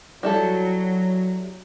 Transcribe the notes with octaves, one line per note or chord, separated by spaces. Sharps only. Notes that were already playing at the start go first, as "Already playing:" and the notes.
F#3 G3 E4 A4